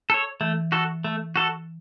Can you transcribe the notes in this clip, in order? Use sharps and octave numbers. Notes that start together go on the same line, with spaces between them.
A4 C#5
E3 A3
F#4 A4
A3
F#4 A4